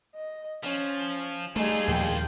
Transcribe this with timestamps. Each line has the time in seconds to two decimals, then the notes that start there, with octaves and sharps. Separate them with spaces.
0.15 D#5
0.63 F3 C#4
1.56 G3 A3 D#4 F4 G#4 A4
1.88 D#2 A#2 F3 G5